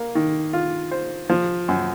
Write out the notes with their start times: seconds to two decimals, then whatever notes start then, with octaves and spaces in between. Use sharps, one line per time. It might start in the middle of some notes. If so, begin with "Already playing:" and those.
Already playing: A#3
0.15 D#3
0.53 F4
0.91 C5
1.30 F3
1.68 F#2